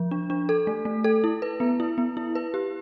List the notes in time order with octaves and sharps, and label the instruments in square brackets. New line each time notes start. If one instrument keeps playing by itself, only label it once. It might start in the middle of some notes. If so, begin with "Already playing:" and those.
Already playing: [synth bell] F3
D4
D4
A4
A3
A3
A4
E4
B4
B3
E4
B3
E4
B4
G4